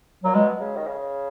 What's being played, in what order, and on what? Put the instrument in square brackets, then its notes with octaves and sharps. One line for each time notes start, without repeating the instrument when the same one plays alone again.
[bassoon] A#2 [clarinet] F#3
[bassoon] B2 [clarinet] G#3
[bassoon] C#3
D#3
C#3